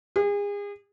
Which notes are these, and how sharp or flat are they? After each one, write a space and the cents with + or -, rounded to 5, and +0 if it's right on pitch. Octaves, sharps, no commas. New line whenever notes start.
G#4 -35